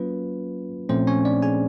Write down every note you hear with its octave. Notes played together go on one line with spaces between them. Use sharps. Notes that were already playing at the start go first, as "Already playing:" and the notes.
Already playing: F#3 A#3 C#4 F4 B4
A#2 F3 A3 C4 C#4 C5
C#4 C#5
D4 D5
G#4 G#5